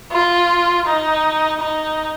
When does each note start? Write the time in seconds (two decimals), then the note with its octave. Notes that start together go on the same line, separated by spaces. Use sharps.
0.12 F4
0.87 D#4
1.61 D#4